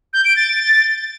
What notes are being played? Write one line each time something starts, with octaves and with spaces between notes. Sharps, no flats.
G6
D7
A6